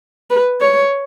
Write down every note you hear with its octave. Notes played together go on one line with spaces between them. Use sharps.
B4
C#5